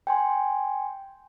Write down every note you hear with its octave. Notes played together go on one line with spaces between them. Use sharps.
G5 G#5 C6